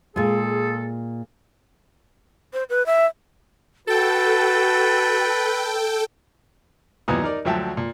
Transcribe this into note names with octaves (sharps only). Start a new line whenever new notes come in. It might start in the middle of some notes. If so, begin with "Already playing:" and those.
A#2 G#3 F4 G#4 A4
C5
B4
E5
F#4 A4 B4 G5 A6
D#2 A#2 E3 F#3 B3 D#6
D#4 A#4 D5
D2 F3 F#3 E5 G5 A5
A#2